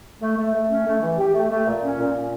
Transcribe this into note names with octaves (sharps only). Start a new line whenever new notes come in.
A3
A3
A3
C#4
A3
E3
G4
A3
A3
A#2
C#4
A#2
C#4